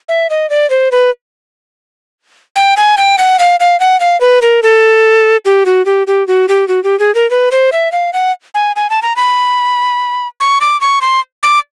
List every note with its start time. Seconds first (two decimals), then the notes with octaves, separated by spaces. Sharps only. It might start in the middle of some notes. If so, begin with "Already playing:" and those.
0.09 E5
0.30 D#5
0.50 D5
0.70 C5
0.92 B4
2.56 G5
2.77 G#5
2.98 G5
3.18 F#5
3.39 F5
3.60 F5
3.80 F#5
4.00 F5
4.21 B4
4.42 A#4
4.63 A4
5.45 G4
5.66 F#4
5.86 G4
6.07 G4
6.28 F#4
6.48 G4
6.68 F#4
6.84 G4
7.00 G#4
7.15 A#4
7.31 B4
7.52 C5
7.72 E5
7.92 F5
8.13 F#5
8.54 G#5
8.76 G#5
8.90 A5
9.02 A#5
9.16 B5
10.40 C#6
10.61 D6
10.81 C#6
11.01 C6
11.43 D6